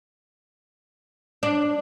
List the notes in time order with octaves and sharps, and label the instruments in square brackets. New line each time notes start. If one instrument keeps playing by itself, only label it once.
[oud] D4